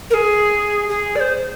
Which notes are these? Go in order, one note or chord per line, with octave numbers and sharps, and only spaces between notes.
A#4
G#4
G#4
D5
C5